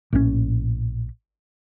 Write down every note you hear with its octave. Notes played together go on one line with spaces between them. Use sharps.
A#1 A2 C#3 C#4